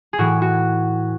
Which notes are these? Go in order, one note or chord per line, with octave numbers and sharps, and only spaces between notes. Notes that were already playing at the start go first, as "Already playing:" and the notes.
G#4
A2 E3 F#4
F#4